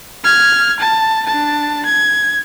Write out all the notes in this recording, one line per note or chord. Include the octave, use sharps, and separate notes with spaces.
F6 G#6
A5
D4 A5
G#6